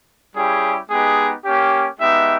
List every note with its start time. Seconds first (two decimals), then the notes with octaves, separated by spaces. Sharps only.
0.34 G3 C#4 E4 G4 G#4
0.89 G#3 B3 D#4 G4 G#4
1.44 A#3 C#4 G4
1.99 G#3 B3 D#4 G4 E5